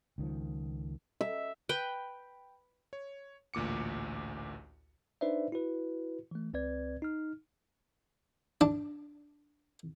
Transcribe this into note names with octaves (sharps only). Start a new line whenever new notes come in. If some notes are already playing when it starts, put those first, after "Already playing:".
C#2 D#3 F3
E5
B4 G5
C#5
A1 D2 A#2 D6 C#7
D4 D#4 B4 C5 D5 E5
E4 F#4 B4
E3 A3
C#2 C4 B4 D5 G#6
D#4 F6
D4